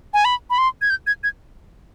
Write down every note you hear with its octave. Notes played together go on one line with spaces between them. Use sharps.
G#5
B5
B5
C6
G#6
G6
G#6
G#6